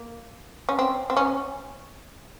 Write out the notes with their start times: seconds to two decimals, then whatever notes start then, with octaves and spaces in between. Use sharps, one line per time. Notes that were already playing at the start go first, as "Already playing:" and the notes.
Already playing: A#3
0.69 C#4
0.79 C4
1.10 C4
1.17 C#4